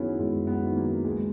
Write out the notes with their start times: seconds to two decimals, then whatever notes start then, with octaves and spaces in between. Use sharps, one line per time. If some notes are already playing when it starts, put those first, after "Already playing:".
Already playing: F#2 D#3 F#3 B3 C#4 E4 G#4
0.19 F#2 G#3
0.47 B3
0.62 D#3 F#3
0.76 A#3
1.05 C#2 G#3